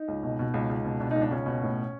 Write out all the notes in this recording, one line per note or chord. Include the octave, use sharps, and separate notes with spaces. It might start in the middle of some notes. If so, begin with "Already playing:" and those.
Already playing: D#4
C#2
B2
B2
C#2
C#2
B2
B2 D4
C#2 D#4
D4
C#2 C#4
B2
A2